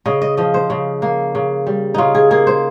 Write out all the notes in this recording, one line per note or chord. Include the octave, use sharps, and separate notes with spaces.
C#3 D#5
D#5
F3 D#5
C5
C#3
A#3
C#3
G3
C#3 D#4 F4
G#4
A#3 G#4
C5